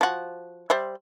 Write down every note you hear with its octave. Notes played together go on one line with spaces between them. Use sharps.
F3 F#4
G3 C5 E5